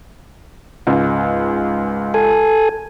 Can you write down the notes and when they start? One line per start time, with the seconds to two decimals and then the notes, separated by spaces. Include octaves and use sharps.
0.87 C#2 G#2
2.14 A4 G#5